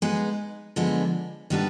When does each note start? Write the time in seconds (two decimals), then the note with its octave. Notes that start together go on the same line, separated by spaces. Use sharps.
0.02 G#3 B3 D#4 G#4
0.76 D3 F3 G#3 B3
1.50 D#3 G3 B3 D4